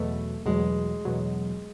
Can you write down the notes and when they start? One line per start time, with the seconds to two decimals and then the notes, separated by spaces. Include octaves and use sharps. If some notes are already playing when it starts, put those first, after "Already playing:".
Already playing: E2 B2 F#3 A3
0.46 E2 B2 F#3 G#3
1.05 E2 B2 F#3